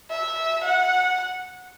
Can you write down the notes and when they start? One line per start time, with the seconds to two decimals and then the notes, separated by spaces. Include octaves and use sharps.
0.11 E5
0.64 F#5